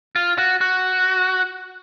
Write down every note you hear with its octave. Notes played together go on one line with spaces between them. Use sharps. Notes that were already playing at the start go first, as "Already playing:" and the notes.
F4
F#4
F#4